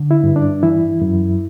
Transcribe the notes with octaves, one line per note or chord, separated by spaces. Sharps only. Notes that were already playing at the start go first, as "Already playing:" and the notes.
Already playing: D3
E4
G2
D4
E3 E4
F#2